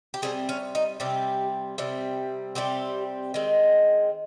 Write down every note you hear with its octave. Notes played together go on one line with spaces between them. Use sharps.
G4
C3 G3 C4 G#4
C#4
D#4
C3 G3 C4 G4
C3 G3 C4
C3 G3 C4 G4
D#3 G#3 C4